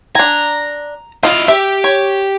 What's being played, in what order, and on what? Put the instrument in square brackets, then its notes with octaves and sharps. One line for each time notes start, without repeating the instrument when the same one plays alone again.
[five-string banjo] D4 G#5 [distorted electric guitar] A#5
[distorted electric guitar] E4 F5 [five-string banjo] F4 D#5
[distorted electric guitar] G4 [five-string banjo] E5
[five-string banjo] C#5